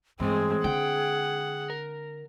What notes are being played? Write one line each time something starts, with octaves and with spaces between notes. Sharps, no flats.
G2 E3 G#3 A3 C4 G#4
D3 F#5 G5
A#4